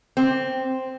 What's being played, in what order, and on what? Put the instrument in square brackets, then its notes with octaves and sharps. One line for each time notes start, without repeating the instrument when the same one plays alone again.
[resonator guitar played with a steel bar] C4